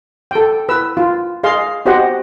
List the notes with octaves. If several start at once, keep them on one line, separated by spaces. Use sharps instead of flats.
A4 G5
B4 E6
F4
G#4 D#5 F5 C6
F#4 G4 C5 D#5 F#5